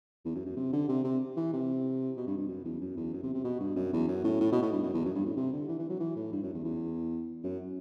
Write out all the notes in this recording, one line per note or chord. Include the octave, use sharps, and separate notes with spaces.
E2
F#2
F#2
C3
D3
C3
C3
E3
C3
B2
G2
G2
F#2
E2
F#2
E2
F#2
C3
C3
B2
G2
F#2
E2
F#2
A2
A2
B2
A2
G2
F#2
E2
F#2
G2
A2
C3
D3
E3
E3
F#3
E3
A2
G2
F#2
E2
E2
F#2